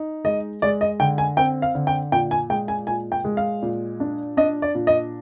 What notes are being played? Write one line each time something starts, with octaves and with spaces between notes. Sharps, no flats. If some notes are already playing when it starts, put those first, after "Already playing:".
Already playing: D#4
G#3 D#5
G#3 D5
D#5
D3 G5
G#5
C4 G5
F5
D3
G5
A#2 G5
G#5
G#3 G5
G#5
A#2 G#5
G5
G#3
F5
A#2
D4
D4 D#5
D5
A#2
D#5